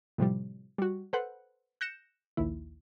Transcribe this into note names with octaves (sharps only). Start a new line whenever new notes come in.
A2 C3 F3 G3
G3 F#4
A4 B4 C5 F#5 F#6
F#6 G6 A#6 C#7 E7
A#1 D#2 E4